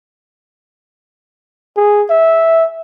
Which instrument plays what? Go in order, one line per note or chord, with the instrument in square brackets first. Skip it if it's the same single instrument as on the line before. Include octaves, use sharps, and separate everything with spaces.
[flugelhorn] G#4
E5